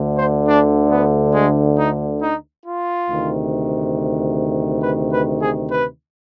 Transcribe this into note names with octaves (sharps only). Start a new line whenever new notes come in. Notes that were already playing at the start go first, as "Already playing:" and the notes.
Already playing: D2 D3
C5
D4
B3
G#3
D#4
D#4
F4
D2 C3 D#3
B4
B4
G#4
B4